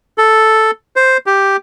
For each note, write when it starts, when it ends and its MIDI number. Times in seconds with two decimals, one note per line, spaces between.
0.18 0.71 69
0.96 1.17 72
1.26 1.56 67